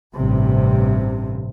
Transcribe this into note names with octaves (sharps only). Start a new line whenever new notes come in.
A1 G2 C3